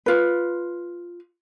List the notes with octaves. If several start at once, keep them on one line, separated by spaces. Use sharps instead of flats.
F4 B4